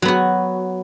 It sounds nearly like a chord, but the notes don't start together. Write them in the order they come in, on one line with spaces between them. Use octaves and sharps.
F#3 B3 F#4